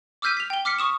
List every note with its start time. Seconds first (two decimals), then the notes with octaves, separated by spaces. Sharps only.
0.22 D6 E6 F6 G6 B6 D#7
0.37 B6 F7
0.50 G5 G7
0.65 D6 F6 B6 C#7
0.79 C#6 D#6 E7